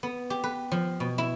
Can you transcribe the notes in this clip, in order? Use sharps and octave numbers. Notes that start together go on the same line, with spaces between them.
B3
G4
B4
F3
B2
E4